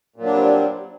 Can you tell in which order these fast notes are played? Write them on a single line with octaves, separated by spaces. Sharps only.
A#2 F#3 D4 G3 C4